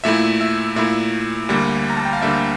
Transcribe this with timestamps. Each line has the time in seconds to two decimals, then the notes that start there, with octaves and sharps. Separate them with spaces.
0.04 A#2 A3 E4 E5
0.41 E5
0.76 A#2 A3 E4 E5
1.49 D2 D3 G3 A#3
1.90 A#5
1.97 A5
2.05 G5
2.13 F5
2.22 D2 D3 G3 A#3 E5